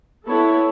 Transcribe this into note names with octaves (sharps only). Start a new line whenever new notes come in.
B3 E4 A4 C#5